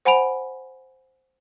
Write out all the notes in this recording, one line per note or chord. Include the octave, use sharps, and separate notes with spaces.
C5 F#5 G#5 B5 D7 F7